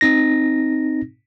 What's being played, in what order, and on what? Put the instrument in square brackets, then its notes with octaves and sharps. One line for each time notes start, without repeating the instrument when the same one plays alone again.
[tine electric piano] C4 D#4 A#6